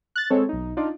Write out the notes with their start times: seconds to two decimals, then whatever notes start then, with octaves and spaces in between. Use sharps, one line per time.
0.16 F#6 A6
0.30 G#3 C4 A4 C#5
0.49 B1 D#4
0.77 D4 D#4 F4 D5